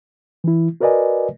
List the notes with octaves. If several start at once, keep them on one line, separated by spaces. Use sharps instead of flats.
E3 E4
F#4 A#4 B4 D5 D#5 G#5